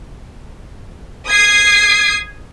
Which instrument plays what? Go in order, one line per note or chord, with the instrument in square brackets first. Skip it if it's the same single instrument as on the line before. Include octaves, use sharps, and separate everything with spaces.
[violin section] D#6 G#6 C7